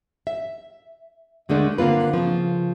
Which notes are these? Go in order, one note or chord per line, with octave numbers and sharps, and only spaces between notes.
E5
D#2 D3 G#3 A3 D4
D3 A#3 C4 F4 B4
C#3 F3